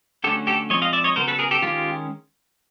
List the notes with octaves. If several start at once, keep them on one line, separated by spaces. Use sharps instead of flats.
D3 F#3 A3 C#4 G4 A4
G4 A4
F3 G#3 C4 C#5 D#5
D#5 F5
D5 E5
C#5 D#5
C#3 F#3 B3 A#4 C5
A4 B4
G#4 A#4
G4 A4
D#3 G#3 C#4 F4 G4